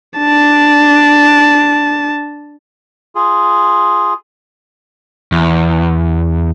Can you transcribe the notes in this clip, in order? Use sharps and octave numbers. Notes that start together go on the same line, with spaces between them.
D4 A5
F4 G#4
E2